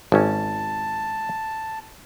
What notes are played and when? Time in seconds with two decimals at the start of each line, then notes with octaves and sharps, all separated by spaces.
0.12 G#1 C#4 A5